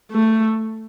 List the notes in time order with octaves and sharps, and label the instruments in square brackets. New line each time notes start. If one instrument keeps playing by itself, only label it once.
[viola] A3